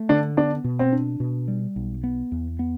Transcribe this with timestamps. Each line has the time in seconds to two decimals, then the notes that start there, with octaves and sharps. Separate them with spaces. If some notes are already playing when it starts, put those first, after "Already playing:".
Already playing: A3
0.09 D3 D4
0.37 B3 D4
0.64 B2
0.79 C4
0.93 D4
1.20 B2
1.48 G3
1.76 B1
2.04 B3
2.32 E2
2.59 B3